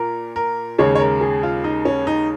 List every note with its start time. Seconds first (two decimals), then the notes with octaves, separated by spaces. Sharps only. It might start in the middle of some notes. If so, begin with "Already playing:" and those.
Already playing: A#2 A#4
0.36 A#4
0.79 D#2 C#3 G#3 C#5
0.95 C#5
1.00 A#4
1.21 G#4
1.43 F4
1.64 D#4
1.85 C#4
2.07 D#4